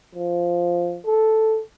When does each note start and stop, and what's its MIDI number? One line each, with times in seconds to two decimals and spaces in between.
0.15 0.99 53
1.06 1.61 69